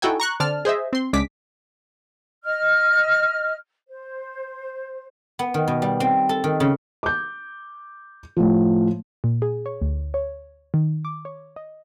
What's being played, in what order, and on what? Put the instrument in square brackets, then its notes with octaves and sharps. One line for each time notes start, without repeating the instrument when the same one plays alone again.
[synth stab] D#4 E4 F#4 A4 G5 G#5
A#5 C#6 F#6
D3 C4 D5 A5 F6
G#4 C5 D#5 E5
C4 C6
C#2 G#3 C#4 D4 D6 B6
[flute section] D#5 F6
C5
[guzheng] B3
D#3
B2
G3
C4
A4
D#3
C#3
[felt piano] D6 G6
A2 F3
[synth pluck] A#2
G#4
C#5
D2
C#5
D#3
D6
C#5
D#5